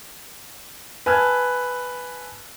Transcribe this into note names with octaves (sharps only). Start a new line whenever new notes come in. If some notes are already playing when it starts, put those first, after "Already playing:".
B4 G#5 A5 E6 F6 G#6